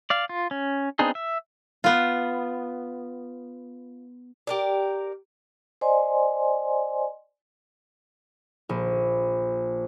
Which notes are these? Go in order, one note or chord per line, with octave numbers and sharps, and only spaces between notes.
D5 F5
F4
C#4
B3 C4 D4 D#4 G#4
E5
B3 F4
G4 A#4 D5
C5 D5 D#5 G#5 C6
A#1